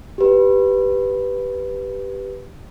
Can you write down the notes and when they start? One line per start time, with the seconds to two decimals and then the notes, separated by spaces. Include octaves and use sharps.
0.18 G4 B4